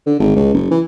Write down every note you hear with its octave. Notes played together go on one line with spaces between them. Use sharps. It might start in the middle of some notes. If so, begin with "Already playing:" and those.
D3
G#1
C#2
F#1
E3